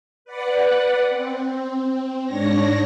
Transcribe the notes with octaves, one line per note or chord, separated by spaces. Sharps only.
B4 D5 F#5
C4
G#2 D4 C#5 A#6